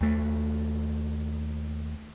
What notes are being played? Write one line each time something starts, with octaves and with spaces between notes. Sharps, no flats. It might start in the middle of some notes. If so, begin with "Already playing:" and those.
D#2 A3